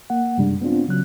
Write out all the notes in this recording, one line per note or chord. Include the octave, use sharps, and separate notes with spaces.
A#3 F#5
F#2 C3 G3 G#3 D4
B3 C4 D4 F4
C#3 F#3 C#4 F#6